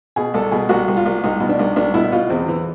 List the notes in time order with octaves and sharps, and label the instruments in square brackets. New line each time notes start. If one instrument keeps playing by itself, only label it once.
[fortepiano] B2 G#4
C2 A4
B2 G#4
C2 F#4
C2
F4
C2
C2 D#4
B2
D4
C2
C2 D4
B2 E4
B2 F4
E2 C4
E3